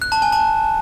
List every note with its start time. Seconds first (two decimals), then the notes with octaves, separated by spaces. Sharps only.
0.02 F#6
0.12 A5
0.22 G#5
0.32 A5